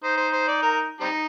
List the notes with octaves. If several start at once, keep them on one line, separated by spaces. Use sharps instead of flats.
D#4 C5
C5
C5
D5
A#4
G3 C4 D#4